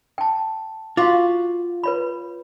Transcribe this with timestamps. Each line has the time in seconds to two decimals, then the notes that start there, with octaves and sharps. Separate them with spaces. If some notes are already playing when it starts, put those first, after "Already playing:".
0.18 G5 A5
0.97 F4 F#4 F5 D6
1.84 B4 C#5 B5